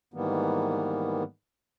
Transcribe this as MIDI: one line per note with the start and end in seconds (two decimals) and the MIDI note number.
0.14 1.23 44
0.14 1.23 51
0.14 1.23 52
0.14 1.23 55
0.14 1.23 58
0.14 1.23 59